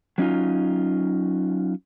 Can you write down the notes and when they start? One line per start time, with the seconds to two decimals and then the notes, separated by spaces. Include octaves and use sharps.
0.18 F#3 C#4 D#4 F4